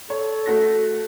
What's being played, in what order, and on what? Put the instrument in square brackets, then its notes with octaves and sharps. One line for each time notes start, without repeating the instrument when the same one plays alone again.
[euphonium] A4 [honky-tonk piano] C#5
[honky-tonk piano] A3 F#4 A#6